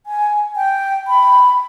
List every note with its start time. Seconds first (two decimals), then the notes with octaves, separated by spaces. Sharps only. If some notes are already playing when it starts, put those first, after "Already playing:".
0.06 G#5
0.56 G5
1.08 B5